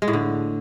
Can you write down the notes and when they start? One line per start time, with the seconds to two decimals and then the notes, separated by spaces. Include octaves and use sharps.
0.02 G#3
0.08 A2
0.13 D3